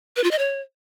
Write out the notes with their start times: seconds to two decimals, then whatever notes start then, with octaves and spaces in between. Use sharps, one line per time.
0.16 B4
0.24 F4
0.31 D#5
0.38 C#5